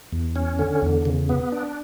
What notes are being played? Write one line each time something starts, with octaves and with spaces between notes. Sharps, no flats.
E2
C#4
D3
E2
C#3
B3
D4